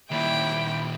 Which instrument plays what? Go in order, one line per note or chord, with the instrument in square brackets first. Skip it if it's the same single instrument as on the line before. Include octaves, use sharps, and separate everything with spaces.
[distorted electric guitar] D#2 A#2 [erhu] E4 [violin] G5